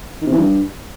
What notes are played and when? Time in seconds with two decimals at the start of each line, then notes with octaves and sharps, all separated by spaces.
0.21 D#3
0.27 C3
0.32 E3
0.37 G2